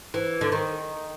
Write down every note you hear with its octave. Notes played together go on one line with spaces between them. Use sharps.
E3
D3
D#3